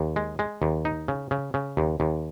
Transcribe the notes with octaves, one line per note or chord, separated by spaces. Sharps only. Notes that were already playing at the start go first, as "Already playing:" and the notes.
Already playing: D#2
G#3
G#3
D#2
D#4
C#3
C#3
C#3
D#2
D#2